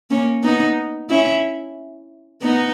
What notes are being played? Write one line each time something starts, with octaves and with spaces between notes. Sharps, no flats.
A#3 C#4
B3 D#4
C#4 E4
B3 D#4